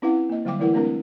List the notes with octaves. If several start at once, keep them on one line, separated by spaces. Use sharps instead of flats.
C4 C#4 E4 B4 F5 F#5
A#3 D#5
D3 F#3 G3 F5 G5 D6
E3 A3 E4 A#4 B4 F#5
G#3 A3 C4 D4 A#4